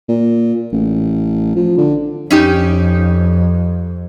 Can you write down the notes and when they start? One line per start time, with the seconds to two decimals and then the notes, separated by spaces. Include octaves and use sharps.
0.09 A#2
0.73 A1
1.56 F3
1.78 D3
2.30 F2 C#4 D#4 G4